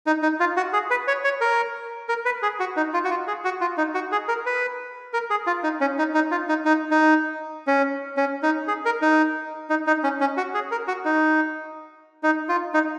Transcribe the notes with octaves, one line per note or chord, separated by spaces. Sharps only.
D#4
D#4
F4
F#4
G#4
B4
C#5
C#5
A#4
A#4
B4
G#4
F#4
D#4
F4
F#4
F4
G#4
F#4
F4
D#4
F#4
G#4
A#4
B4
A#4
G#4
F4
D#4
C#4
D#4
D#4
F4
D#4
D#4
D#4
C#4
C#4
D#4
G#4
A#4
D#4
D#4
D#4
C#4
C#4
F#4
G#4
A#4
F#4
D#4
D#4
F4
D#4